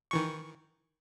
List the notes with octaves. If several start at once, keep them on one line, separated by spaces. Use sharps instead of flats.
D#3 E3 C#6